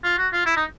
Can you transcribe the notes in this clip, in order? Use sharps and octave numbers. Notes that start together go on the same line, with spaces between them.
F4
F#4
F4
E4
D#4